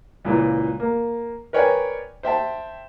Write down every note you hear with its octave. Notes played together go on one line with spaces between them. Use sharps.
C#2 A#2 E3
A#3
A#4 B4 C#5 D5 G5 G#5
C5 E5 G5 A5